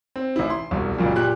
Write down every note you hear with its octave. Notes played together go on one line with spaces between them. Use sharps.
C4
A1 E4
C6
E1 C2
F#1 C#2 F#2 A#2
A#2 G4 F#6